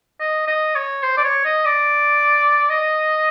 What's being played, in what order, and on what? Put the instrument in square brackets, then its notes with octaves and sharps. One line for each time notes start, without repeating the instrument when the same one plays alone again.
[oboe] D#5
D#5
C#5
C5
D5
C#5
D#5
D5
D#5